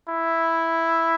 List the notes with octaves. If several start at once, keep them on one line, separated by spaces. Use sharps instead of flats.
E4